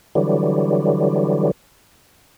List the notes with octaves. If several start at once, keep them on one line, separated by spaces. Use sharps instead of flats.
D3 E3 F#3 G3